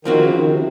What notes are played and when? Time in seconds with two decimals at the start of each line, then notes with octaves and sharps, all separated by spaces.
0.05 D#3 F3 C4 F#4
0.20 C#3
0.34 D#3
0.49 C3